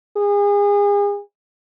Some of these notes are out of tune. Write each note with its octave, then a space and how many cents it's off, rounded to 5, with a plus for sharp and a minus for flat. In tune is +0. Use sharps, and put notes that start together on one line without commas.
G#4 -35